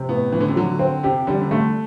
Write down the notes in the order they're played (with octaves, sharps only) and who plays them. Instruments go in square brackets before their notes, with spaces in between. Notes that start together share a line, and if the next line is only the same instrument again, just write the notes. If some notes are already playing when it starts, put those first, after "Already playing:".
Already playing: [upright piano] C3
[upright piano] A2 [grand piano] B3
[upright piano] A2 [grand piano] E3
[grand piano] D3
C3
[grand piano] D3 [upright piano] F#3
[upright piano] C4
[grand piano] C3 [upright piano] G4
[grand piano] D3 [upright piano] G3
[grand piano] C3
[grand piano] D3 [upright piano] A3